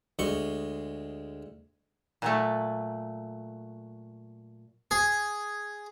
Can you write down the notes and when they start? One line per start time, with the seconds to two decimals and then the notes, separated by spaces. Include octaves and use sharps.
0.19 D2 G#3 C#6
2.22 A#2 F#3 A3
4.91 G#4